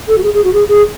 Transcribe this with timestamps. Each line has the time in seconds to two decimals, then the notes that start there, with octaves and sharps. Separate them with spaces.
0.08 A4
0.18 F#4
0.24 G#4
0.34 G#4
0.44 F#4
0.54 G#4
0.68 G#4